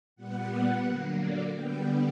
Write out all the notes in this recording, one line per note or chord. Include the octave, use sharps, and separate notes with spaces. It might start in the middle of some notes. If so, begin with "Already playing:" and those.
A#2 G3 B3 F#5
D3 F#3 A#3
D5
D3 G3 B3 G5